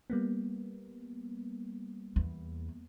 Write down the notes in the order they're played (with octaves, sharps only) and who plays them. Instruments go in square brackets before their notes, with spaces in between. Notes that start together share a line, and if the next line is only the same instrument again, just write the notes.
[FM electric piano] G3 A#3 B3
[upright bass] E2